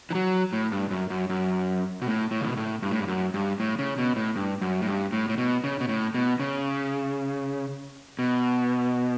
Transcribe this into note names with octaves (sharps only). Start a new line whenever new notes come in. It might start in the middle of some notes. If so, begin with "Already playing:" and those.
E3
F#3
A2
G2
F#2
F#2
F#2
B2
A2
A2
C#3
B2
A2
G2
A2
G2
F#2
G2
A2
C#3
B2
A2
G2
F#2
A2
G2
A2
A2
B2
C#3
B2
A2
B2
C#3
B2